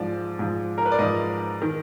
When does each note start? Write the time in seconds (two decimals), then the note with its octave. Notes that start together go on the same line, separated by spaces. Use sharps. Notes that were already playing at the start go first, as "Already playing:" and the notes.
Already playing: G#2 F3 D5
0.39 G#2 F3
0.78 A#4
0.86 B4
0.92 D5
0.99 G#2 F3 D#5
1.62 D#3